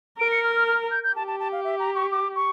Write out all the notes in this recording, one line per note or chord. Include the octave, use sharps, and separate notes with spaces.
A#4 D7
C#7
F6
F6
F6
G6
G6
G4 A5
A5
A5
F5
E5
A#5
C#6
D6
C#6